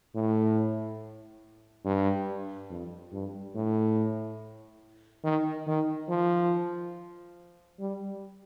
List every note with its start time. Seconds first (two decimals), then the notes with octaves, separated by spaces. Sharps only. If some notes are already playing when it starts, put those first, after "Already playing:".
0.15 A2
1.84 G2
2.70 F2
3.12 G2
3.55 A2
5.24 D#3
5.67 D#3
6.09 F3
7.80 G3